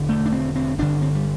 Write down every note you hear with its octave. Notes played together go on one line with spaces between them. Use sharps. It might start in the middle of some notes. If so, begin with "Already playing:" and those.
Already playing: E1 D3
A3
D4
C4
C4
G1 G2 D3 D4
C4
G3